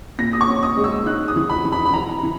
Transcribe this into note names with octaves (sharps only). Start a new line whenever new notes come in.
A#2 A#6
D#6
C#6
C#4
D#6
G#3
E6
D#4 F#6
D#6
E3
B5
E3
B5
B5
E3 A#5
E3